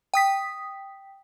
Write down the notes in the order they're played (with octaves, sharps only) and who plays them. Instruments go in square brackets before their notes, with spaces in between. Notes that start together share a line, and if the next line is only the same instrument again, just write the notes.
[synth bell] G5 D#6 B6